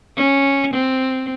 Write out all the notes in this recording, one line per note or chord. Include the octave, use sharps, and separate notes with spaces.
C#4
C4